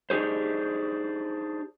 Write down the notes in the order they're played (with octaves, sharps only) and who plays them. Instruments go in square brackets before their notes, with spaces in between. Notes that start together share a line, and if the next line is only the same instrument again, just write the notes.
[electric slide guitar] D4 D#4 G4 G#4 C5